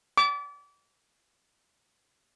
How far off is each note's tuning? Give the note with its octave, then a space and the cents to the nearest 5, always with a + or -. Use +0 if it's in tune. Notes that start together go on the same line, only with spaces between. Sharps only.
D6 -35